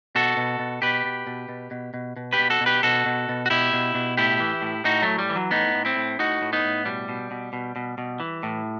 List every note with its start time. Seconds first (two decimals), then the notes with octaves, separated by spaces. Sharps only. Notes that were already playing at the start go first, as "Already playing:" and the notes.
0.15 B2 F#4 A4
0.37 B2
0.59 B2
0.82 B2 G4 B4
1.05 B2
1.27 B2
1.49 B2
1.71 B2
1.94 B2
2.16 B2
2.33 G4 B4
2.39 B2
2.50 F#4 A4
2.61 B2
2.66 G4 B4
2.83 B2 F#4 A4
3.06 B2
3.29 B2
3.46 F#4
3.50 B2 E4 G4
3.73 B2
3.95 B2
4.17 A2 E4 G4
4.40 E3
4.62 A2
4.84 A2 D#4 F#4
5.02 A2 F#3 A3
5.19 G3
5.30 E3
5.36 F#3
5.51 A2 B3 D#4
5.75 A2
5.85 C4 E4
5.96 A2
6.19 A2 D#4 F#4
6.42 A2
6.53 B3 D#4
6.64 A2
6.85 B2 G3
7.09 B2
7.31 B2
7.53 B2
7.76 B2
7.98 B2
8.20 E3
8.43 A2